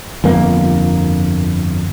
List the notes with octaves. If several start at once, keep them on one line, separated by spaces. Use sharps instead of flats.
G1 F2 A#3